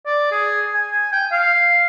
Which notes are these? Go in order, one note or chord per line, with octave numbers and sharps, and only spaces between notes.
D5
G#4
G#5
G5
F5